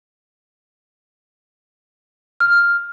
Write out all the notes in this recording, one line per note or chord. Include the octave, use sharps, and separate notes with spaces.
F6